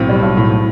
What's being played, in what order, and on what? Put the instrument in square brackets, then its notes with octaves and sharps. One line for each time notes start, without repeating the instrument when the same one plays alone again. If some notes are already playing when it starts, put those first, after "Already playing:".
Already playing: [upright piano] B1 A2 C4
G3
B1
A2
A2